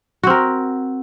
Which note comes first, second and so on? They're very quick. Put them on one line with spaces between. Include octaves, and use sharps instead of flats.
F#4 C4 A#4